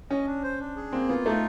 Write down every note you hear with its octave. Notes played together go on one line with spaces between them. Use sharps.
C#4 D#5
D4
C5
D4
G#4
A#3 C4
B3 F4
A3 D#4